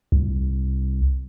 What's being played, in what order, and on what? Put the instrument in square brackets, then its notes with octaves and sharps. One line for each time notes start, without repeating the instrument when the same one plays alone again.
[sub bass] C2